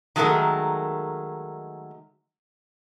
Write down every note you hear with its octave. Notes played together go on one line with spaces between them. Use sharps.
D#3 F#3 G#3 A3 A#4